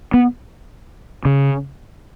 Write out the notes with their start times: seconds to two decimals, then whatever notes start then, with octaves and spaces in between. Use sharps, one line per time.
0.14 B3
1.25 C#3